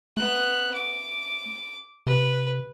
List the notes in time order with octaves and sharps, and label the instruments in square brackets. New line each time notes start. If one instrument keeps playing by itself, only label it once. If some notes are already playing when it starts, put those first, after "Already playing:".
[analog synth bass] A3 [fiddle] B3 F#6
[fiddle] D6
[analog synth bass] C3 [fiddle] B4